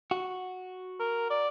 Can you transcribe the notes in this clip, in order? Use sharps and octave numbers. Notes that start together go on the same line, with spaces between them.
F#4
A#4
D5